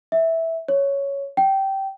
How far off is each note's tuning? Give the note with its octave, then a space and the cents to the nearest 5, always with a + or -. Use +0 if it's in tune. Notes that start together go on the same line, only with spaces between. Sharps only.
E5 -10
C#5 +5
G5 -15